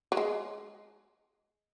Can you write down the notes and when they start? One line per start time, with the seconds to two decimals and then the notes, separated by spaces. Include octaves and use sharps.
0.12 F#3
0.17 G#3